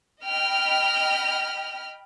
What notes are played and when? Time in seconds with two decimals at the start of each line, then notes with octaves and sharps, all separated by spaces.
0.23 D#5 G5 B5 F6